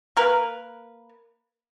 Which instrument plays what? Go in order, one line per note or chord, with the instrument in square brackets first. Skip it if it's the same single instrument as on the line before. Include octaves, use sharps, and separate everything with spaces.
[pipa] A#3 A#4 B4